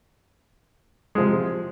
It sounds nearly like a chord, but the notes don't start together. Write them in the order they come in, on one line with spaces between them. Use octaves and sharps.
G#3 F3 C3